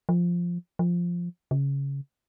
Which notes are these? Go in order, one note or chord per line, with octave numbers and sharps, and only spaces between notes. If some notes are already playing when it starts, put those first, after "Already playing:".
F3
F3
C#3